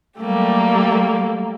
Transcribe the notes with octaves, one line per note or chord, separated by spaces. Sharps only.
F#3 G3 A3 A#3 G4